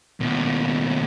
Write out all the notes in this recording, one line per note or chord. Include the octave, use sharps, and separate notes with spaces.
D#2 B2